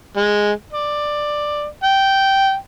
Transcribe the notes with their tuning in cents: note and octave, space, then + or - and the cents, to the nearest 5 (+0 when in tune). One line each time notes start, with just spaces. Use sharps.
G#3 -5
D5 +10
G5 -10